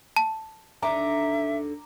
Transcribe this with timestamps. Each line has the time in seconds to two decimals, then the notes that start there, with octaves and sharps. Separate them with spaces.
0.16 A5
0.82 D#2 D3 D4 E5 A#5 D6